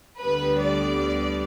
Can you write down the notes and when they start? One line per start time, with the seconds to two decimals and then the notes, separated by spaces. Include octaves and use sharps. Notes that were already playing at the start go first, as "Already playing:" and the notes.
0.20 D2 D3 G3 B3 B4
0.60 D5